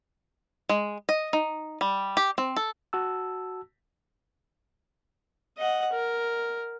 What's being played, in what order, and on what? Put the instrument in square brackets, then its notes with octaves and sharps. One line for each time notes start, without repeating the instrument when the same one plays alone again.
[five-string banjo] G#3
D#5
D#4
G3
G4
C4
A4
[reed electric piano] F#4 A5 E6
[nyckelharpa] D#5 F#5
A#4